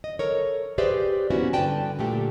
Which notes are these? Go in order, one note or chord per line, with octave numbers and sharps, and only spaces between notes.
D#5
A4 A#4 C#5
G4 G#4 B4 C5 D5 E5
A#3 B3 C#4 E4 F#4
G2 D3 B4 D5 G5 A5
A#2 D3 A3 G4